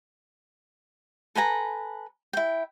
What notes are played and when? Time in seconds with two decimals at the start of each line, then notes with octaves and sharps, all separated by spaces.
1.35 A4 B4 G#5 A#5
2.33 E4 G5